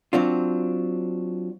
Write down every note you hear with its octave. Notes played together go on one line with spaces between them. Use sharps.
F#3 C4 D4 F4